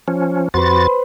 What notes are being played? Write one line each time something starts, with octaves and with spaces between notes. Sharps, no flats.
F3 C#4
F2 F#4 B4 C5 A6